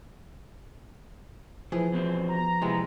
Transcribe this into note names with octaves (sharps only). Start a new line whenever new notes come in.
E3 F3 G#4 B4
E2 B2 C4
A#5
C3 E3 G#3 B3